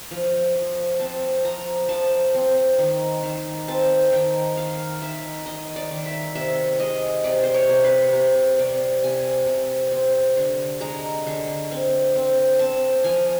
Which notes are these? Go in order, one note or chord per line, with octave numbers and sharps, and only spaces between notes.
F3
F3
C4 A5
F3 A#5
F3 A5
C4
D#3
D#3
C4 A5
D#3 G5
D#3 F5
D#3 E5
D#3 D#5
D5
D#3
E5
C3 E5
G#3 D#5
C3 D5
C5
C#5
C3
B4
C3
C3 D5
C3 G#5
C3
C4
D3
G#3 A#5
D3
C4
C4
C4 A5
F3 G#5